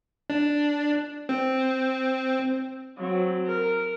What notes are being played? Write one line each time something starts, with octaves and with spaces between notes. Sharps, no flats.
D4
C4
F#3 C4
A#4